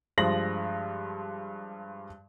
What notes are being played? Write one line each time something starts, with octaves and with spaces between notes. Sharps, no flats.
G2 F3 G#3 A#6 F#7